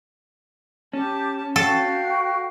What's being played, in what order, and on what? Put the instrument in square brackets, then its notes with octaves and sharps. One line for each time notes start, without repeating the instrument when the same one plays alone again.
[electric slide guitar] C#4 [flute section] G4 [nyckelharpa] A5
[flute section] F#4 G5 [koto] A4 [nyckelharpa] F5